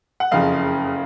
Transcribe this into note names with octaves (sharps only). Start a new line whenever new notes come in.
F#5
F#1 F2 C#3 F5